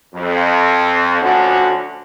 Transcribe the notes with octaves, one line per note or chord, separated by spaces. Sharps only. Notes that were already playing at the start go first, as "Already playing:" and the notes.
F2
D2 D3 F3 C#4 F#4